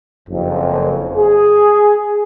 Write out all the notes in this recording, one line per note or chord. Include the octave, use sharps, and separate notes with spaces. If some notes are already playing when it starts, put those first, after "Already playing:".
F#1 F2
G#4